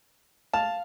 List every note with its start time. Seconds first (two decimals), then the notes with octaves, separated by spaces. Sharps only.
0.53 F5 A5